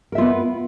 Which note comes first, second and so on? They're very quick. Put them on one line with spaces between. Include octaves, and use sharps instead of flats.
A#4 E5 F4 B3